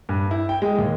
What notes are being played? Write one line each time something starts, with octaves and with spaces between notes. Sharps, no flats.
G2
E4
G5
G#3
D#2